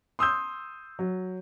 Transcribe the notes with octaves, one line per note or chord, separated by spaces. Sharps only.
C6 D#6 E6 G6
F#3